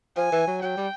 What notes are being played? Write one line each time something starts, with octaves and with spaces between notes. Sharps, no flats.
F3 G#5
E3
F#3
F#3 G5
G3